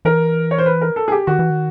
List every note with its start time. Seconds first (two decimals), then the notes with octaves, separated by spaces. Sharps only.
0.05 E3 A#4
0.51 C#5
0.58 C5
0.66 B4
0.81 A#4
0.96 A4
1.08 G#4
1.12 G4
1.27 D#3 F#4
1.39 E3
1.50 D#3